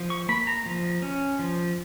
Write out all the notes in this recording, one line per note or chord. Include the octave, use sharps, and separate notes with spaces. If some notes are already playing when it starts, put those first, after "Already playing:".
Already playing: F3
C#6
A#3 B5
A#5
F3
C#4
F3